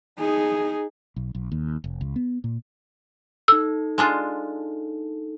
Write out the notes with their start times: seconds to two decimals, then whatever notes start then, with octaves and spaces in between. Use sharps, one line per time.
0.19 D#4 G#4
1.16 B1
1.35 B1
1.52 D#2
1.84 F1
2.01 C#2
2.16 B3
2.44 A#2
3.48 D#4 A4 E6
3.98 G#3 D4 F4